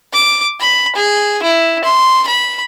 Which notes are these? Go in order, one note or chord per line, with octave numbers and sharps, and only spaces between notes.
D6
B5
G#4
E4
C6
B5